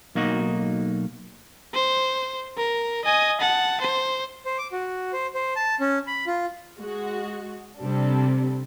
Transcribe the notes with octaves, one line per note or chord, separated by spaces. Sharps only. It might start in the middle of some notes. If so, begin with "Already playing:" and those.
B1 A#3 D#4 F#4
C5
A#4
D#5 G#5
F#5 A5
C5
C5
D6
F#4
C5
C5
A5
C#4
B5
F4
G#3 F#4
C3 G3 C4 D4 A4